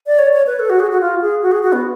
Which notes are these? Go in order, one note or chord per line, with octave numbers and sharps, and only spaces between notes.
D5
C#5
C#5
B4
A4
F#4
G#4
F#4
F4
G#4
F#4
G#4
F#4
B3